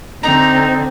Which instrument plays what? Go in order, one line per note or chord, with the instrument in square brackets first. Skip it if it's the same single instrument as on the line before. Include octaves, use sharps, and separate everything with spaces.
[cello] D3 C4 [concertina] D#4 [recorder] A#5